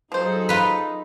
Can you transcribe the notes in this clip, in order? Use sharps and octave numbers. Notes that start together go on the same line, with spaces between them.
F3 F#3 D#4 G#4 A4 C5
F4 B4